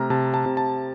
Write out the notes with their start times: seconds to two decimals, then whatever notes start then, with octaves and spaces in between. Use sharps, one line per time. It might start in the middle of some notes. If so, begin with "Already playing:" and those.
Already playing: C3 A3 A#5 F6
0.10 C3 A5
0.34 A5
0.46 C3
0.57 A5